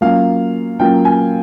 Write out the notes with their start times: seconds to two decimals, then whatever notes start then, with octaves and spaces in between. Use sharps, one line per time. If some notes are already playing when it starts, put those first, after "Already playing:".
0.01 F#3 A#3 C#4 F4 F5
0.80 F#3 A#3 C#4 F4 G5
1.05 G#5